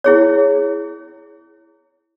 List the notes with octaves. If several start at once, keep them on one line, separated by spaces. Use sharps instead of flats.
E4 G#4 C#5